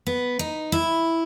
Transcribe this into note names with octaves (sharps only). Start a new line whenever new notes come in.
B3
D#4
E4